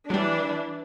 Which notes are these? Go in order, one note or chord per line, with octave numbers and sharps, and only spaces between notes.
E3 F#3 G3 D4